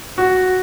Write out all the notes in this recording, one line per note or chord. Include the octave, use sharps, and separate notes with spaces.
F#4